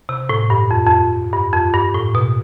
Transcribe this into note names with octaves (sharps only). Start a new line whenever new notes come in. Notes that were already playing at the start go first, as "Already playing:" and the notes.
C3
A2
G2
F2
F2
G2
F2
G2
A2
B2